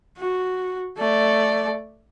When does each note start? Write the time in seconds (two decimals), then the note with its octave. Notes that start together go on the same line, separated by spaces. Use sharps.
0.17 F#4
0.97 A3 D5